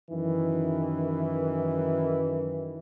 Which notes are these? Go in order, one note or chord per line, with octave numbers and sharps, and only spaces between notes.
F#2 D#3 E3